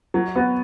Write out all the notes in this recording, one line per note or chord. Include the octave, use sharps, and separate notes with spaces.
F#3
B3 F#4